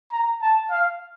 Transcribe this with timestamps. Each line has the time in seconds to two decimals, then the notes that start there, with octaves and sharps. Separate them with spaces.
0.12 A#5
0.41 A5
0.71 F5